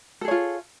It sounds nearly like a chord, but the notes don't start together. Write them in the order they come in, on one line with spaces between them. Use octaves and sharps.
A4 G#4 C#5 F4